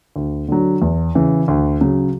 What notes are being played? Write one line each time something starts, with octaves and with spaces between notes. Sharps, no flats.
D2
D3 F#3
E2
C#3 E3
D2
C#3 F#3